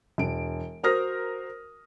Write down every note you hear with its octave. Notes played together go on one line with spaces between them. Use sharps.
E1 D7
F#4 A#4 C5 D#6 F6 A#6